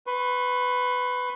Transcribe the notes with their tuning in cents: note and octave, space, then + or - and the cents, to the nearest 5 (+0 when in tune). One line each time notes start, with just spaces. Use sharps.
B4 +15 C#6 -45